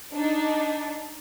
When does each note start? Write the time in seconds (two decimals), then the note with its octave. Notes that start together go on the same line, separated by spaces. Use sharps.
0.14 D4 D#4